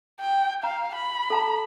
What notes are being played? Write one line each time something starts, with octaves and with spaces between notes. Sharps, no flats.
G5
F5 A#5
B5
A4 A5 A#5